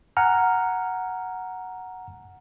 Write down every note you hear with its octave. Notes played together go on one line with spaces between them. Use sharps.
F#5 G#5 A#5 F6